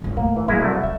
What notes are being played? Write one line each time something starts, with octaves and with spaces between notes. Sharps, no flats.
G1 C#2
A2 A#3
E3
F#3 G#3 A#3 E4
C2 A3 F#4
G#3 E5